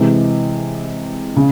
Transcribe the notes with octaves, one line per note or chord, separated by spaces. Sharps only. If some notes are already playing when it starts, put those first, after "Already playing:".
Already playing: C3 E3 G#3
C#3